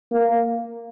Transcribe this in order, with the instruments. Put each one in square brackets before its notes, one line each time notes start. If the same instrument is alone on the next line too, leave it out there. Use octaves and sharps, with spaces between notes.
[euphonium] A#3